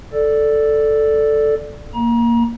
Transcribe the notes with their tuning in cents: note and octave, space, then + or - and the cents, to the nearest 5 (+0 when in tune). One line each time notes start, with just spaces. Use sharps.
A4 +0 D5 +0
A#3 +0 A#5 +35